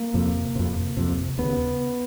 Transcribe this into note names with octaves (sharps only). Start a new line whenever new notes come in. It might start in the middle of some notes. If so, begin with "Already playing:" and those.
Already playing: A#3
F2 C3
F2 C3
F2 C3
D#2 C#3 B3